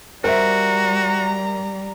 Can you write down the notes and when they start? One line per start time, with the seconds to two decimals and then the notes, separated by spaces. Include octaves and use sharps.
0.24 G3 F#4 A#4 C5 E5 A#5